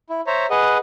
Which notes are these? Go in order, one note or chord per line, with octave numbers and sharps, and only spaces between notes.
E4
C5 C#5 E5 A#5
G#4 B4 D#5 F#5